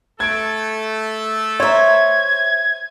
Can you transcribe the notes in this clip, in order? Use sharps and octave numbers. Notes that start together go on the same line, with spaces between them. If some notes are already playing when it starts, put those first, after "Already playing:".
A3 A4 G#6 D7
C5 C#5 E5 A#5 G#6